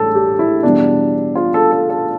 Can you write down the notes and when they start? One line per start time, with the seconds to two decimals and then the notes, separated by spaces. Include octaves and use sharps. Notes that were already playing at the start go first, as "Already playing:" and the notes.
Already playing: A1 G3 A4
0.15 G4
0.39 E4
0.63 E2 B2 G3 D4
1.35 F4
1.54 A4
1.72 A4
1.90 A4